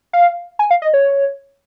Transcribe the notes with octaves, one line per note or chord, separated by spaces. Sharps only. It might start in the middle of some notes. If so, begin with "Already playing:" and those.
F5
G#5
F5
D#5
C#5